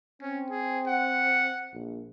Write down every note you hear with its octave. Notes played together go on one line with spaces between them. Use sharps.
C4 C#4
G#4
F#5
A#1